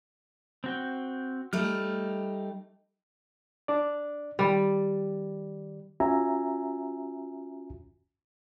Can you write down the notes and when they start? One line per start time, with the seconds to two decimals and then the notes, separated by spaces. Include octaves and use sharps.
0.64 C4 F#4 G5
1.53 G3 A3 D#4 F6
3.68 D4 D5
4.39 D#3 G3 D5
6.00 C#4 F4 F#4 E5 G#5 A#5